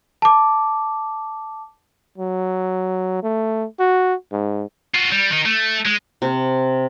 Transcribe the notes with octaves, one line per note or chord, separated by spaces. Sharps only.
A5 D6
F#3
A3
F#4
G#2
F4 F#4
G3
D#3 D#4
A3
G#3
C3